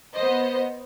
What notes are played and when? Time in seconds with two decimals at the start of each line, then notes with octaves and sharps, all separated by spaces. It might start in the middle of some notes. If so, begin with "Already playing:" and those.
0.15 B3 C5 D#5